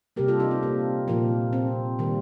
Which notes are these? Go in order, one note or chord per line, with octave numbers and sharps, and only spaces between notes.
C3 G3 A#3 G4 A#4
F4 A4
D#4 G4
C4
A#3
A#2 F3 A#3
C4
D#3 G3 A#3